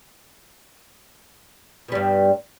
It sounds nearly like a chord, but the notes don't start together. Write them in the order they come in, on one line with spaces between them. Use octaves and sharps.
B2 G3 G2